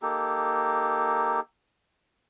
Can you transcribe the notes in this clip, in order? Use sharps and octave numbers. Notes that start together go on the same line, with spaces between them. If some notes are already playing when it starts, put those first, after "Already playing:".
A#3 D#4 G4 A4